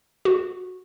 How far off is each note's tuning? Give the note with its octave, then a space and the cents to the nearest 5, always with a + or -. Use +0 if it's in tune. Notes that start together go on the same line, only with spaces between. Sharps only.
F#4 -10